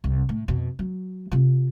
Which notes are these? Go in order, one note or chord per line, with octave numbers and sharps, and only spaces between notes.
C2
A2
F2 B2
F#3
C3 F4